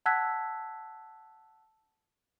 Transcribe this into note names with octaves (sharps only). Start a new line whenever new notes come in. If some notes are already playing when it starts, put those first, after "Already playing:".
F#5 A5 E6 F#6 G#6 B6